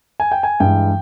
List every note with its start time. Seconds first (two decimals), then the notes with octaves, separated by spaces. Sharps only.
0.20 G#5
0.32 G5
0.43 G#5
0.60 G2 E3 G#3 G5